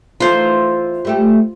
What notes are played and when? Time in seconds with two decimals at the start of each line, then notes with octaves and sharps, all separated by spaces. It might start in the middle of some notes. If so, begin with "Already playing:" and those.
0.20 E3 A3 D#4 F4 C5
1.05 G3 A3 G4